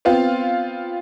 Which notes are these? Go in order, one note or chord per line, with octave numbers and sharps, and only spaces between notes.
B3 C4 F4